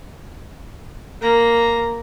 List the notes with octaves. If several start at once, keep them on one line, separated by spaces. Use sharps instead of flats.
A#3 A#5